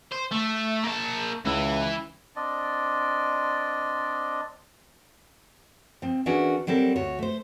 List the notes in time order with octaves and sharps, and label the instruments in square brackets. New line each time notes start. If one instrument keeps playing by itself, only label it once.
[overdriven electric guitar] C5
A3
A#3 A5
[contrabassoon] C#2 [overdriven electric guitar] E3 E4
[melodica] C4 D4 D5 D#5
[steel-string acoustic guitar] F3 C4
E3 C#4 D4 F#4 G#4 A#4
F#3 G3 C4 A4 A#4
D2 F#4 C#5
A3 C5